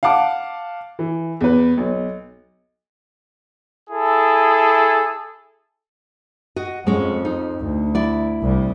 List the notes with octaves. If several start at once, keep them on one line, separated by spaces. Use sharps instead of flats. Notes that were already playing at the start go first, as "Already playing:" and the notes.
F5 F#5 A5 D6
E3
E2 B4
B1
E4 G#4 A4
F#4 D#5
F2 G#3 C#4
D#4
D2
E4 D5
C2 G3